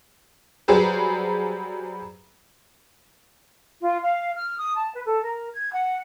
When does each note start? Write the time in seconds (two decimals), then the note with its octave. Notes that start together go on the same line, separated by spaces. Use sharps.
0.68 F#3 G3 G#4 B4 C5
3.83 F4
4.02 F5
4.35 F6
4.58 D#6
4.75 A5
4.93 B4
5.06 A4
5.23 A#4
5.54 G#6
5.73 F#5